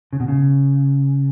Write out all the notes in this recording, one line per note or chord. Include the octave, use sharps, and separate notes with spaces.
C#3
B2
C#3